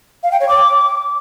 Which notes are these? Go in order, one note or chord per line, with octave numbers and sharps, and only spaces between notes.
F5
G5
C#5
D6